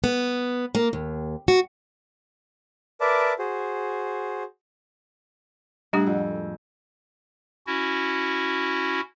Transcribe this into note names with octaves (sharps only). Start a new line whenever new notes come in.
B3
A#3
D#2
F#4
A#4 B4 D5 E5 A5 D6
F#4 G#4 C5
A2 G3 D4 G4 G#4 F#5
F2
C#4 E4 F#4